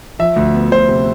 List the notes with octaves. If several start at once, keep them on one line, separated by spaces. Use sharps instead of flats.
F3 E5
D2
B3
D2 C5
C3